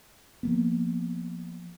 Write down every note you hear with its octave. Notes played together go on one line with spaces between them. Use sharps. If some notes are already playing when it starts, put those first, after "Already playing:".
F3 A#3 B3